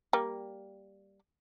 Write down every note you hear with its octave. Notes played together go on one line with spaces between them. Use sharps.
G3 A#3